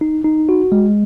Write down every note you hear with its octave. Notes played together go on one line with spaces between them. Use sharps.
D#4
D#4
F#4
G#3